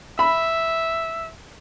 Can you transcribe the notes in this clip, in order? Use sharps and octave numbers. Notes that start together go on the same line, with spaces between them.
E5 B5